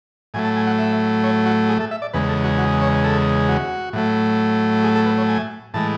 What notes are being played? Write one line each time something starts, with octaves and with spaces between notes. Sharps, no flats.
A2 F#3 A3 G#5
A5
G#5
F#5
E5
C#5
F#4
G#4
A4
E5
D5
E2 C#3 G#3 B4
A4
F#4
F#4
C#5
A4
F#4
A2 F#3 A3
G#4
A4
B4
C#5
G#5
A2 E3 G#3 A5